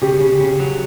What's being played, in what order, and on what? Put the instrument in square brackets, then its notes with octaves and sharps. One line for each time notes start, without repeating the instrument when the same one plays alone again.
[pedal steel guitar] C#3 [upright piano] G4
[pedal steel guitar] C#3
C#3
F#3